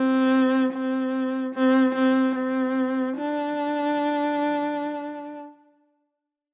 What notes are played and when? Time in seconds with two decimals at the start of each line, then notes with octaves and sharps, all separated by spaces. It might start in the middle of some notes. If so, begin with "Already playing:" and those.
Already playing: C4
0.73 C4
1.55 C4
1.95 C4
2.35 C4
3.18 D4